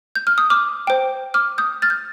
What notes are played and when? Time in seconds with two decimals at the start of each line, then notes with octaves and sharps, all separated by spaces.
0.15 G6
0.27 F6
0.38 D#6
0.50 D6 F6
0.87 C5 G5
1.34 D6 F6
1.58 D#6 G6
1.82 F6 A6
1.90 G6